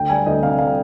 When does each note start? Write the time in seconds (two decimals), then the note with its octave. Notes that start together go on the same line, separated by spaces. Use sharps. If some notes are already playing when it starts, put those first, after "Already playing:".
Already playing: D2 G5
0.09 G3 G#5
0.26 D2 D#5
0.43 C3 F5
0.59 G3 F5